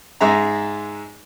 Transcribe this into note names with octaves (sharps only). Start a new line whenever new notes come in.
G#2 G#3 G#4 E5 A#5